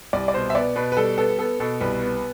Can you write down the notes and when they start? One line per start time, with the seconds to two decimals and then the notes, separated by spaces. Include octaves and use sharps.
0.13 C2 D5
0.28 D5
0.34 B2 C5
0.50 E5
0.55 B3 D5
0.76 B2 B4
0.92 B4
0.97 G3 A4
1.18 B3 A4
1.39 B3 A4
1.60 B2 A4
1.80 C2 B4
2.02 B3